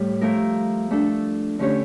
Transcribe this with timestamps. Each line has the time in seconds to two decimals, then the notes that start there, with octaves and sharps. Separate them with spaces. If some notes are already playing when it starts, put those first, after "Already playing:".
Already playing: A2 G3
0.21 F3 A3 E4 A#4
0.91 A3 D4 A4
1.59 D3 A3 C#4 G4 C#5